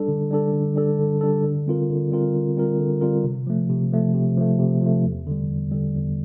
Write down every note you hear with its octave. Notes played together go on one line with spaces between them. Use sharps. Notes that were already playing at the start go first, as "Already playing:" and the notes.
Already playing: G3 D4 A4
D3
G3 D4 A4
D3
G3 D4 A4
D3
G3 D4 A4
D3
G3 C4 F4 A#4
D3
G3 C4 F4 A#4
D3
G3 C4 F4 A#4
D3
G3 C4 F4 A#4
C3
F3 A3
C3
F3 A3
C3
F3 A3
C3
F3 A3
E2
D3 G3
E2
D3 G3
E2